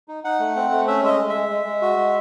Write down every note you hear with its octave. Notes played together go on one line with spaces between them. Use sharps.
D#4
D#4 F#5
A3
C4
A3
C#4 E5
G#3 D#5 E5
G#3
E5
G#3
G#3
G#3
F#4
G#3